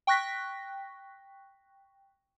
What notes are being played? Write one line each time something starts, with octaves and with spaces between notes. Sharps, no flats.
G5 C#6 F#6 A#6 B6